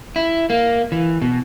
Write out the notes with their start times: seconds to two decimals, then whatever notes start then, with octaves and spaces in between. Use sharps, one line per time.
0.16 E4
0.50 A#3
0.92 E3
1.22 B2